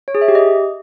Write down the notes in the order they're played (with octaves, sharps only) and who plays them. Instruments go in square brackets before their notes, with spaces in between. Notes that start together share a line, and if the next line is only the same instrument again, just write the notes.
[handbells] C#5
G#4
E5
G4
D#5